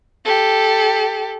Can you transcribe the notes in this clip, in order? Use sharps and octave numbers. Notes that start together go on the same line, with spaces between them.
G4 A4